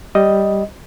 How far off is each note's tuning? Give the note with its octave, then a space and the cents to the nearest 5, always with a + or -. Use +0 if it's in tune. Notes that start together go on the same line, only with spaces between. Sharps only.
G3 +0 D#5 +5